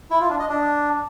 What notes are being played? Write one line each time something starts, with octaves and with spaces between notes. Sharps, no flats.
E4
F4
D4
D#5
D4